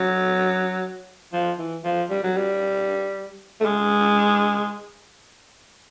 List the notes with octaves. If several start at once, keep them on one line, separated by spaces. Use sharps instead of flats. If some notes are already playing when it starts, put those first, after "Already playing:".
Already playing: F#3
F3
E3
F3
G3
F#3
G3
A3
G#3